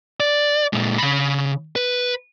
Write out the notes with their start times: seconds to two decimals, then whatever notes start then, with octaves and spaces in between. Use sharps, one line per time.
0.20 D5
0.73 A#2 G#3
0.98 C#3 B5
1.76 B4